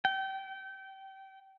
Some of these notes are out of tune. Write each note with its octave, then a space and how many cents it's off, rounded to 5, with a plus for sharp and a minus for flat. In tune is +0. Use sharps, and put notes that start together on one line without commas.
G5 -25